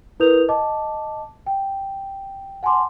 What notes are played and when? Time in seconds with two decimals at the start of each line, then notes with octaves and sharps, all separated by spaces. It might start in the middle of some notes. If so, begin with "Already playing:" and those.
0.20 E4 A#4 B4 D#6 G6 F7
0.49 D#5 A5 D6
1.46 G5
2.63 F#5 G#5 A5 C6 D6